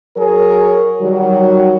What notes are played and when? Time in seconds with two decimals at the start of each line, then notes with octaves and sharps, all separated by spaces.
0.17 F#3 G#4 A#4 C#5
1.01 D#3 F#3 G3